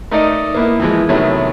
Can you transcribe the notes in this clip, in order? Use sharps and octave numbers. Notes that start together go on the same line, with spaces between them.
A3 D#4 A4 A#4 D5 D#5
A#3 B3 E4
E3 F3 G#3
C3 D#3 F#3 A3 B3